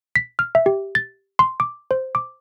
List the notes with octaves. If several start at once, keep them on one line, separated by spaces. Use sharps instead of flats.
B6
F6
E5
G4
A6
C6
D6
C5
D6